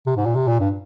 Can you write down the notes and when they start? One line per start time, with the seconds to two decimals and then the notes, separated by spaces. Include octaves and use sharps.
0.06 C3
0.16 G#2
0.26 A#2
0.35 C3
0.47 A#2
0.60 G2